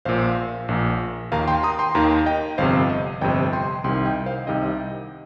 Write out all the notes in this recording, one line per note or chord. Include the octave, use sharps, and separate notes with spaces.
A#1 A#2 C5 F5
A#1 A#2
D#2 D#3 F5 A#5
G5 C6
A#5 D#6
G5 C6
D#2 D#3 F5 A#5
D#5 G5
G1 F2 C3 C5 F5
D#5
G1 F2 C3 D#5 G5
G5 C6
C2 C3 D#3 G5 C6
D#5 G5
C5 F5
C2 C3 D#3 D#5 G5